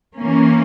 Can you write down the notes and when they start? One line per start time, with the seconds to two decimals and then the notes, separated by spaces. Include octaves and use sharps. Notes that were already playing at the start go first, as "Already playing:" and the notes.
0.16 E3 A#3 C#4